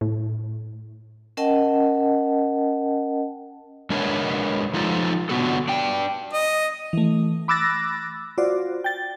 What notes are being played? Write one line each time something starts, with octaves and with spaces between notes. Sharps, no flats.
A2
C#4 A#4 D#5 F#5 G5 A5
G#3 D4 A#4 B4 C#5 E5
F3 D#4 F4 A4
D3 F#3 B3 F#4 A4
D4 G5
D#5
E3 A3
B5 D6 E6 F#6 A6 A#6
F4 F#4 C5 D5
G5 A6